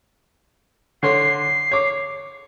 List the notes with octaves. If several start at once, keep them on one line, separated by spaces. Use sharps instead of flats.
D3 C#5 C6 C7
C#5 D6